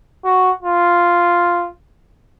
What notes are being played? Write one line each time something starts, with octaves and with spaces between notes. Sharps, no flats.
F#4
F4